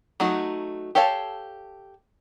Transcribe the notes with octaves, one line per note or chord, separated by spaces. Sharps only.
F#3 A3 D#4 F#4
G4 A4 C#5 F5 A5